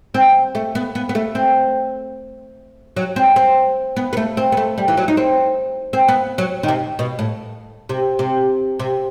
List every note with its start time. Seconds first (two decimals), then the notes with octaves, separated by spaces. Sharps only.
0.14 C4
0.55 A3
0.75 B3
0.95 B3
1.09 B3
1.15 A3
1.35 C4
2.96 F#3
3.16 C4
3.36 C4
3.96 B3
4.13 B3
4.17 A3
4.37 C4
4.52 B3
4.57 A3
4.78 G3
4.88 E3
4.97 F#3
5.08 D#4
5.17 C4
5.93 C4
6.08 B3
6.38 F#3
6.63 D#3
6.68 C3
6.99 B2
7.19 A2
7.89 C3
8.19 C3
8.79 C3